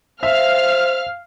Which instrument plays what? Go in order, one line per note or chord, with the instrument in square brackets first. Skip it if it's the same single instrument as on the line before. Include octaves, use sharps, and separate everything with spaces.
[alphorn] C5 [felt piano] E5 [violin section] F5 F6